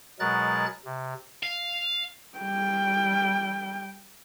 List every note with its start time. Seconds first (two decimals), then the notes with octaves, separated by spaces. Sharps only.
0.20 B2 F#3 G#3 A#4 F#6 A6
0.85 C3
1.43 F5
2.38 G3 G5